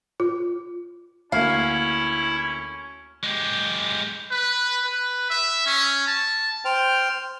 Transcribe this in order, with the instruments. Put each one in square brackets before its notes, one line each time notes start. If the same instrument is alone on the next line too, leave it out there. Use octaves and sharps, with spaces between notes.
[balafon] F4
[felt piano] D2 A#3 [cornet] C#4 [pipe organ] E4 [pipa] F5
[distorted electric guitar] G#3 G4
[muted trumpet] B4
B4
E5
C#4
A5
[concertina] C5 G5 F6